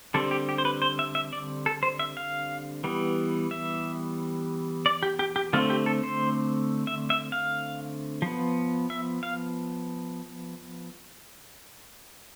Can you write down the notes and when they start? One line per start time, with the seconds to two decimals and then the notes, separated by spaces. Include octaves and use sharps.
0.14 D3 G3 C4 A4
0.31 G4
0.49 G4
0.58 C5
0.65 B4
0.82 C5
0.99 E5
1.15 E5
1.33 D5
1.66 A4
1.83 C5
1.99 E5
2.17 F5
2.84 E3 G3 B3
3.51 E5
4.86 D5
5.03 G4
5.19 G4
5.36 G4
5.53 D3 A3 C4 F4
5.70 G4
5.86 A4
6.03 C5
6.87 E5
7.10 E5
7.32 F5
8.22 F3 B3
8.90 E5
9.23 F5